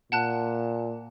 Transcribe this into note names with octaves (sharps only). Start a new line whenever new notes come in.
A#2 F#5 A5 F#6